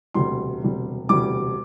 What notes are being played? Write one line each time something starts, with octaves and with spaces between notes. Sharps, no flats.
E1 D2 C3 G3 C6
E1 D2 C3 G3
E1 D2 C3 G3 D6